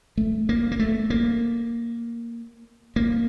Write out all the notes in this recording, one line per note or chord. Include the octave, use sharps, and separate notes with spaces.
A3
A#3
A#3
A3
A#3
A#3